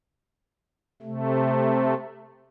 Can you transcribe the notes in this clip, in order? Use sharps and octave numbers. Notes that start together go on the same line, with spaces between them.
C3 A3